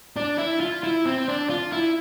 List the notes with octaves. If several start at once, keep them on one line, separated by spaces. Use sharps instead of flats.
D4
E4
F4
E4
C4
D4
F4
E4